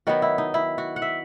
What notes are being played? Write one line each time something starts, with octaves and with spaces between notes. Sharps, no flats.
D#3 F#3 B3 F#4
E4
D#4
E4
F#4
F#5
E5